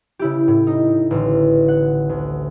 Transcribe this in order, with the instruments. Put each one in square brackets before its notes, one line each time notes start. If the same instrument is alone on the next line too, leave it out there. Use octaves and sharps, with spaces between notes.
[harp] C#3 E4 G4
A2
D#4
A1 D3
F#5
D2